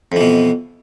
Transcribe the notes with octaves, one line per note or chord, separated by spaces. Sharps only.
F2 B2 E3